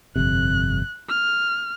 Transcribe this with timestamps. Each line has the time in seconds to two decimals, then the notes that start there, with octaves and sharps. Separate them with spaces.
0.16 G1 F2 C3 F#6
1.09 F6